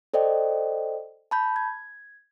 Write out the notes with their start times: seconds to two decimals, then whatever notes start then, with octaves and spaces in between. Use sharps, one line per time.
0.14 A4 C5 D5 D#5 G5
1.31 A5 B5 G6
1.56 G#6